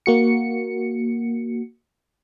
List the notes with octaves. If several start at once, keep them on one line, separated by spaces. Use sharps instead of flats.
A#3 F#4 C#7